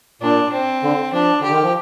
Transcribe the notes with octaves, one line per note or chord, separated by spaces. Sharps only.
A#2 D4
C4
D3
F3 D4
D3 G4
D#3
F3